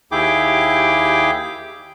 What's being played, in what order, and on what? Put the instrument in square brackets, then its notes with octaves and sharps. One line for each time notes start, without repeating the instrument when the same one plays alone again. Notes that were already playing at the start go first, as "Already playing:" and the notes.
[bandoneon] D#2 E4 G4 G#4 G5 D6